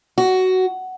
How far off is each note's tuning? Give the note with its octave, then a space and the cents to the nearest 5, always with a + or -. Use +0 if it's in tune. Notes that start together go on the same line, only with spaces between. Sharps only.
F#4 +10